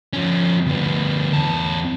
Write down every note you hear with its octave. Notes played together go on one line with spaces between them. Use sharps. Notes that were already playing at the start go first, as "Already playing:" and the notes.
F3 C#4
D2 B3
E2 A5